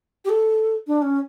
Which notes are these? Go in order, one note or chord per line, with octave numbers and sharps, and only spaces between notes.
G4
A4
D4
C#4